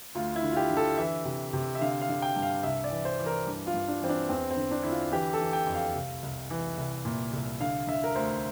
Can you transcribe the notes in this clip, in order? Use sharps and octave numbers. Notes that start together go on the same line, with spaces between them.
D2 F4
E4
D3
F4
G4
D3
A4
E3 E5
C3
C3
E5
D3 F5
F5
D3
G5
G2
F5
C2 E5
D5
E3
C5
E3
A#4
G2
F4
G2
D4
E3 C4
D4
E2 C4
C4
D3
D4
D3 E4
F4
E3 G4
A4
E3
G5
F2
F5
C2
C2
E3
C2
A#2
C2
D3 F5
D3 E5
A#4
D2 C5